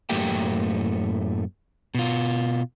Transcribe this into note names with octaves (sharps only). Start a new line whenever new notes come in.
F#2 A2 A3 A#3 G4 G5
B2 F4